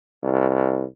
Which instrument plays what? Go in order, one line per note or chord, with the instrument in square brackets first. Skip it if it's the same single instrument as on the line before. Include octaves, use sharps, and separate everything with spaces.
[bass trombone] C2